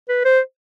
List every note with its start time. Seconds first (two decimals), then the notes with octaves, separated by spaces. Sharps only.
0.09 B4
0.25 C5